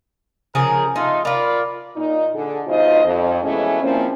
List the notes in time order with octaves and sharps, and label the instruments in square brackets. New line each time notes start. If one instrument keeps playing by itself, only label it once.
[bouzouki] C#3 F3 G#4 [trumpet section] A#4
[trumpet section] A3 F4 [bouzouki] D#4
[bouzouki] F4 A#4 [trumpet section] D5 F5 B5
[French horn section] A#2 D#4
D3 G#4
G2 B2 D#4 F4 C5 D#5
F2
B2 E3 G#3 A3 C#4
A#2 F3 A#3 C4 C#4 E4